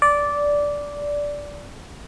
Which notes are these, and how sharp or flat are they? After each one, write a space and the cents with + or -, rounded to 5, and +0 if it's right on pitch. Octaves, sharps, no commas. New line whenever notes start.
D5 -10